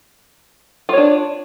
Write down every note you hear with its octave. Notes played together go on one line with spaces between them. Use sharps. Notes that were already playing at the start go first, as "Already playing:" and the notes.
D4 F4 C#5